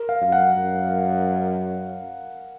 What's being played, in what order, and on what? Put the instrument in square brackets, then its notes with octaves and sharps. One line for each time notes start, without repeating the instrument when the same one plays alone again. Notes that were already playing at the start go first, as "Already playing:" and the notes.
Already playing: [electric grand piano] A#4
F5
[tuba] F#2
[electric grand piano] F#5
[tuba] F#2